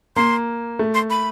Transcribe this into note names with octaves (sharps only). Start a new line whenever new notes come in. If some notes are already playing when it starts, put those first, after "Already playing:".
A#3 C6
A3
C6
B5